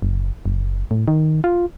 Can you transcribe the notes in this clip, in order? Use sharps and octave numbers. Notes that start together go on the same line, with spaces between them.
F#1
F#1
A2
D#3
F4